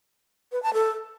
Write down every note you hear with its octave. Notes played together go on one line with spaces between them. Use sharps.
B4
A5
A4